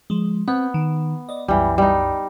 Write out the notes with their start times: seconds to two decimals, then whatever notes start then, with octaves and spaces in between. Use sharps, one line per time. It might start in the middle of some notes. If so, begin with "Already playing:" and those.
0.10 F3 G#3
0.48 B3 C4
0.74 D#3
1.29 D5 D#5
1.48 C2 F#2 E3 G3
1.78 G3 D#4